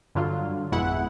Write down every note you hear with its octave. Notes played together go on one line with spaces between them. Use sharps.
G2 D3 F#3 F4
G#1 F2 B2 G#3 E4 F#5